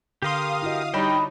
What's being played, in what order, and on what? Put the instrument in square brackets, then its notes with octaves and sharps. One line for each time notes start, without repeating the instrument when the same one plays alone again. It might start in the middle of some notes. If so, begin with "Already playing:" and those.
[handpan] D3 [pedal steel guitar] G4 A#4 C6 [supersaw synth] F5 D#6
[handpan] E4 F#4 D#5
[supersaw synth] G3 D#4 [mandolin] D4 D#5 B5 [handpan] C#5 [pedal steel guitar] G5